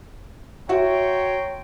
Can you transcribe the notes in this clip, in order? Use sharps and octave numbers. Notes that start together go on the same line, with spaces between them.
F#4 C#5 E5 F#5 G5 A#5 C6